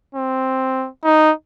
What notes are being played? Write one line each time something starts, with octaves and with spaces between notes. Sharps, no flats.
C4
D#4